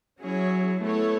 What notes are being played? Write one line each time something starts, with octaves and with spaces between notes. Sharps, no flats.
F#3 C#4 E4 G#4 C#5
A3 B3 E4 A4 C#5